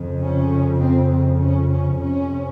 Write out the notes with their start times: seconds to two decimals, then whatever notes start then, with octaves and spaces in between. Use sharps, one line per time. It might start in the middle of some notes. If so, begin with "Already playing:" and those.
Already playing: F2 C#3
0.20 C#4
0.80 C4
1.09 C4
1.40 C#4
1.69 C#4
1.99 F2 C3 C#4